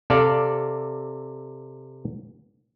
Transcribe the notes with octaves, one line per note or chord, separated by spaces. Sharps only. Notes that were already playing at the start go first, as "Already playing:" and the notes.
C3 A4 D5 F5